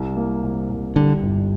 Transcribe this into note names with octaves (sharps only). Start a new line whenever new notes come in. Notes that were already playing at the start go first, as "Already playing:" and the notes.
Already playing: C2
A#3
C2
C2
D3 G3
G1